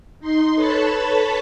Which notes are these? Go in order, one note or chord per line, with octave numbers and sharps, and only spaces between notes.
D#4 C6
A4 B4 C#5 A5 B5